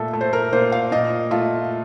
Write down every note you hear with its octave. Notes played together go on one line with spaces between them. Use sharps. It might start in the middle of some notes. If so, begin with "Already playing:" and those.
Already playing: A#2 A3 A4
A3
C5
A#4
A#2 C5
F5
A#2 D#5
A3 F4